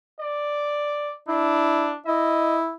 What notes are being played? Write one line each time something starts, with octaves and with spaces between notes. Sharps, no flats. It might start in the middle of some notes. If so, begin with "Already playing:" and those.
D5
D4 E4
E4 D#5